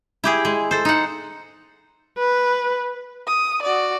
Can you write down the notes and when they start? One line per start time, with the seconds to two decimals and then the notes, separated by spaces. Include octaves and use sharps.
0.24 E4 G4 G#4
0.45 G#3
0.71 A4 C5
0.85 D#4 F#5
2.18 B4
3.27 D#6
3.63 F#4 D5